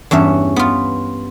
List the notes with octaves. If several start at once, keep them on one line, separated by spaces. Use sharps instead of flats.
E2 G2 C#4 E5
B3 F4